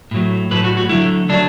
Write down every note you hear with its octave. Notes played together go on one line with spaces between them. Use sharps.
A2 F#3 A3
A2 F#3 A3 B4
F#4
F#4
D3 F#3 A3 E4
D3 F#3 A3 D4